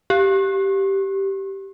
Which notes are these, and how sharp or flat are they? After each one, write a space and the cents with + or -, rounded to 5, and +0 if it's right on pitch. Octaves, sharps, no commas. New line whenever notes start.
G4 -10